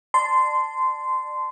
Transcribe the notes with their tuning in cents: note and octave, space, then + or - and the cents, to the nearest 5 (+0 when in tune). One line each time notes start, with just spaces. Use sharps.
D5 +30 A5 +0 C6 -15